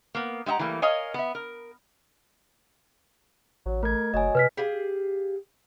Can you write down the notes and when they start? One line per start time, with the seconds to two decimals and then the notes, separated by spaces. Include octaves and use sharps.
0.15 A#3 B3
0.46 G#3 G4 E5 F#5 A#5
0.59 E3 G3 A3 A#3
0.82 A#4 C#5 D#5 F5 G#5
1.14 B3 E5
1.35 A#4
3.66 A1 F#3
3.83 A3 A#4 G#6
4.14 F#1 F#3 D#5 G#5
4.35 C3 B4 F6 B6
4.57 G4 G#4 F5